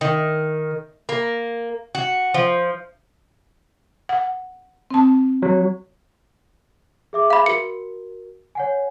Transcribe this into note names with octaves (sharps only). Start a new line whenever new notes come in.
D#3
A#3
F#4
F3
F#5
C4 A5
F#3
G#4 E5 D6
F5 B5
F#4 A#4 C#7
C#5 F#5 G#5